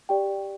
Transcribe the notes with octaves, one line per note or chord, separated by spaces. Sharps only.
G4 D5 G5